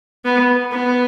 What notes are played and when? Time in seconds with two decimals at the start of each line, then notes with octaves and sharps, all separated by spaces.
0.25 B3
0.72 B3